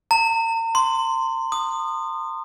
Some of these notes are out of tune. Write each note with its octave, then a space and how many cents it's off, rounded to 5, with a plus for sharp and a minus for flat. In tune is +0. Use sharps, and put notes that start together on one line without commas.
A#5 -40
C6 -5
D#6 -25